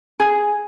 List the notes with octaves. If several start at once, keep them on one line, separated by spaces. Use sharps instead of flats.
G#4